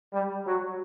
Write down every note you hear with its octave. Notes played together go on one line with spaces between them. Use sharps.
G3
F#3